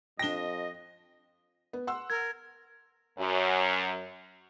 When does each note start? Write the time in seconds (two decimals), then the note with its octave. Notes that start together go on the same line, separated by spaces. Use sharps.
0.19 F2 D4 D#5 G5 A#6 G7
1.73 B3
1.87 F#5 C6 E6
2.10 A#4 G#6
3.19 F#2